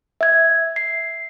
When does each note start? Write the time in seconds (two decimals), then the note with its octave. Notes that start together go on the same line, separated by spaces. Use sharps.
0.21 E5 G#6
0.76 C7